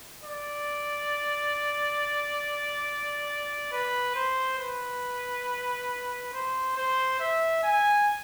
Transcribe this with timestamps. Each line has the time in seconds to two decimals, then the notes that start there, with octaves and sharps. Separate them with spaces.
0.24 D5
3.72 B4
4.15 C5
4.59 B4
6.33 C5
6.77 C5
7.20 E5
7.63 G#5